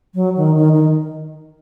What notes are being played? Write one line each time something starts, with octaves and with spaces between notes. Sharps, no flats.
F#3
D#3
D#3
D#3